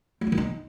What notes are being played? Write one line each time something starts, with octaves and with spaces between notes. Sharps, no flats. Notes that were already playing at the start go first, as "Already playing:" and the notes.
A3
F4
D#3
D#4